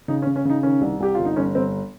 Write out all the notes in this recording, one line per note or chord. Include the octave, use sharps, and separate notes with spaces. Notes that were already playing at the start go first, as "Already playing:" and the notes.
C#3 D#4
C#4
C#3
C#4
C#3 D#4
D#3 C#4
C2
C2 G4
G1 F4
D#4
G1 C#4
G1 C4